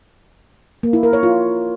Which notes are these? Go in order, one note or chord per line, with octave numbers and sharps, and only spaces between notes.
A#3
E4
A#4
C#5
F4